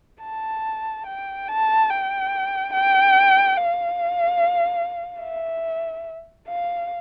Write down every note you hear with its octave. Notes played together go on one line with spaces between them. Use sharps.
A5
G5
A5
G5
G5
F5
E5
F5